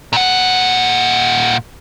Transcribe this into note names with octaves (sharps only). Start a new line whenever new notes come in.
A#2 F#5